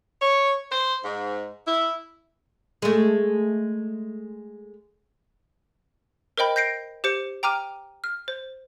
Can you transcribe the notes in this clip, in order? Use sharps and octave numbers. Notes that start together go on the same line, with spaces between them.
C#5
C5
G#2
E4
G#3 A3
A#4 C5 D#5 G5 B5
G6 A#6 C7 D7
G4 C5 C#7
G5 A#5 D6 F6 D#7
F6
C5